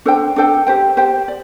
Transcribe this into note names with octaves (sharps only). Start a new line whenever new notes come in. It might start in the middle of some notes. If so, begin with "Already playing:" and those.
D4 A4 C5 G5
D4 A4 C5 G5
G4 C5 G5
G4 C5 G5
D5